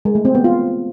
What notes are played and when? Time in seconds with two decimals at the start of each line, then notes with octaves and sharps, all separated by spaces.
0.05 G#3
0.15 A3
0.25 C4
0.35 B3
0.44 F4